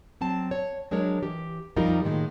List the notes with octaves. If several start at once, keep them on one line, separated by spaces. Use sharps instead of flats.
F#3 C4 A5
C#5
F#3 G#3 D4 A#4 C#5
E3 G4
F2 F3 G3 D#4 F4 A#4
A2 D#3 G#3 A#3